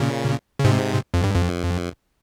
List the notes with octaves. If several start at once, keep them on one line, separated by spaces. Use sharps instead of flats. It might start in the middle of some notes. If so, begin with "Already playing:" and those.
Already playing: A#2 C#3
C#3
G#2 C3
F2
G2
F2